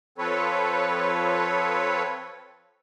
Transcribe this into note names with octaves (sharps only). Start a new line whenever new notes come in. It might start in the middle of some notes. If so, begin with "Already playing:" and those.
F3 C4 A4 B4 C#5